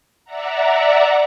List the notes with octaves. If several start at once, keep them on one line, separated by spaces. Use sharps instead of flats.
D5 E5 F#5 A#5